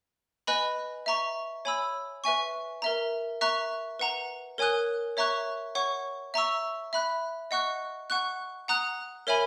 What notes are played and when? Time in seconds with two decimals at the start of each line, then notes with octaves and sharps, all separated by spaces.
0.47 B4 D#5 G#5 B5 F#6
1.06 E5 A#5 C#6
1.65 C#5 G#5 B5 E6
2.24 B4 E5 G#5 C#6
2.82 A#4 E5 A#5
3.41 E5 A#5 C#6 F#6
3.99 B4 F#5 A#5
4.58 A#4 C#5 G#5 D#6 F#6
5.17 C#5 E5 A#5 C#6 F#6
5.75 C#5 F#5 C#6
6.34 E5 A#5 C#6 E6
6.93 E5 B5 F#6
7.51 D#5 F#5 C#6 F#6
8.10 F#5 C#6 F#6
8.68 F#5 A#5 D#6 F#6
9.27 A#4 C#5 E5 G#5 B5